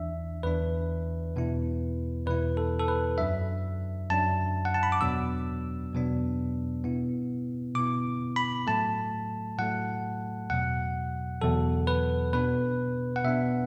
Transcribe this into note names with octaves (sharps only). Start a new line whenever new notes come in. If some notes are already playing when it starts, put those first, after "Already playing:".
Already playing: E2 E3 D4 E5
E2 E3 D4 B4
E2 B2 B3 E4
E2 B2 B3 E4 B4
A4
A4
B4
F#2 F#3 D4 E5
F#2 F#3 D4 A5
F#5
A5
B5
D6
E2 B2 F#3 B3 D4 E6
E2 B2 F#3 B3 D4
B2 B3 E4
B2 B3 E4 D6
B5
A2 F#3 A3 A5
A2 F#3 A3 F#5
E2 B2 F#3 F#5
E2 B2 F#3 A4
B4
B2 B3 D4 B4
F#5
B2 B3 D4 E5